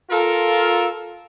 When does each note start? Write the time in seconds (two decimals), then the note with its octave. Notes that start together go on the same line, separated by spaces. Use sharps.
0.10 F4 A4 A#4